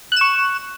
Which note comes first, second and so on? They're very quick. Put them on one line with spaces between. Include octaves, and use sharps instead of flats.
F#6 E7 C#6